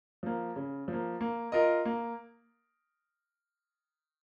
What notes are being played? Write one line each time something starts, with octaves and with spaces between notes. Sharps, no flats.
F3 A#3
C#3
F3 A#3
A#3
F4 A#4 D#5
A#3